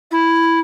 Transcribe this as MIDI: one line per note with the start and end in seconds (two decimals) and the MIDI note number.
0.11 0.59 64